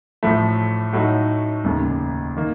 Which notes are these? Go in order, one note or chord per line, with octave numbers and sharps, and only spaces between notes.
A1 A2 F3 A3
A2 F#3 A3 D#4 F#4
F1 D#2 C#3
D#3 A#3